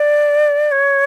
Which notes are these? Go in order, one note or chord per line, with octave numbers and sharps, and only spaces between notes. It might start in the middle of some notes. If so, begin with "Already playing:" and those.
Already playing: D5
C#5